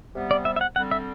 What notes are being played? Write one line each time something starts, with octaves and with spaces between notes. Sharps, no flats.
C3 G3 B3
D5
E5
E5
F#5
D3 G3 C4 F#5
E5